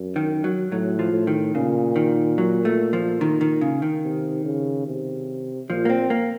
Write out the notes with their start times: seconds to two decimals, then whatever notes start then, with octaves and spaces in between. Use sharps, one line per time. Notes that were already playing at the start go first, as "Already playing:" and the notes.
Already playing: F#2
0.16 D#3
0.44 F#3
0.72 A2 F#3
0.99 F3
1.13 A2
1.27 D#3
1.55 A#2 C#3
1.96 D#3
2.38 F#3
2.65 A3
2.93 F3
3.21 D#3
3.41 D#3
3.61 C#3
3.82 D#3
4.04 C3
4.45 C#3
4.87 C3
5.69 A#2 F3
5.85 A#3
5.89 C4
6.10 A#3